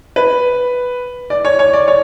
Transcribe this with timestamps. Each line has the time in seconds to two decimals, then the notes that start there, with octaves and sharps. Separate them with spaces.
0.16 B4
1.30 D5
1.45 C#5
1.59 C#5
1.73 D5
1.88 C#5